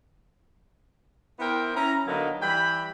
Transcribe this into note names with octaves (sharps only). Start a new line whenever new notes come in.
B3 E4 A#4 C5 G5
C#4 E4 A#5
D3 F#3 A#3 B3 D#4
E3 G3 G5 B5